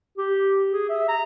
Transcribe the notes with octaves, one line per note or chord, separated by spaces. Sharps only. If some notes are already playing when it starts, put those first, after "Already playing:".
G4
G#4
E5
A#5